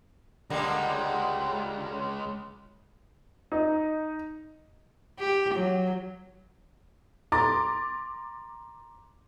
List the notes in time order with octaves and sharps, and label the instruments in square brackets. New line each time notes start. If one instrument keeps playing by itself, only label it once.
[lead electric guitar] C#2 G#3 [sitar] D3 G3 A#3
[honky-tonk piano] D#4
[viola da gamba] G4
F#3
[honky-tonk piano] A#5 C6 D6 A6